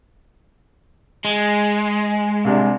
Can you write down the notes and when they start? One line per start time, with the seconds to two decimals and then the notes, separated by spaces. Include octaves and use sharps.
1.25 G#3
2.45 C2 C3 D4